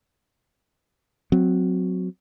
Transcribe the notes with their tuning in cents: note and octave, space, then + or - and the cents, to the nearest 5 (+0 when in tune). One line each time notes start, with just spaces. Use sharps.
F#3 -10 C4 -20